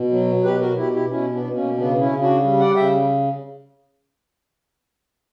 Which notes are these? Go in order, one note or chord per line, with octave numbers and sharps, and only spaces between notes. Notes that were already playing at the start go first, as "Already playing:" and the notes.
Already playing: B2
F#3
B2 G4 B4
F#4 A#4
B2 E4 G4
E4 G4
B2 C#4 E4
B3 D4
B2
A#3 C#4
C#3 B3 D4
C#4 E4
C#3
D4 F#4
G3
D5 F#5
C#3 E5 G5